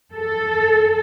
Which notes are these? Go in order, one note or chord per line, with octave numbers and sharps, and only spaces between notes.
A4